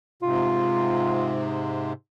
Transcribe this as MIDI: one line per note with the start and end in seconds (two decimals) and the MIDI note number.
0.23 1.93 44
0.23 1.93 48
0.23 1.42 65